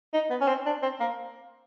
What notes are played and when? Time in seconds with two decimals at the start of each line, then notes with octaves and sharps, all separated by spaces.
0.14 D#4
0.30 B3
0.41 C#4
0.48 C4
0.66 D4
0.82 C4
1.00 A#3